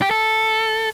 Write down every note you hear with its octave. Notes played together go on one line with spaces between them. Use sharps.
G4
A4